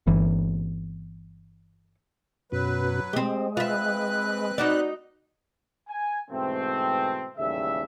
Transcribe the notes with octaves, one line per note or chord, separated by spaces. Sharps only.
G1 E3
F#2 B2 F#3 B4
G#3 C4 G4
C4 F4 B4 E5 F#6
D#4 F#4 D5
G#5
G#2 B2 E3 A3 C4
A1 D#2 C#3 G3 A4 E5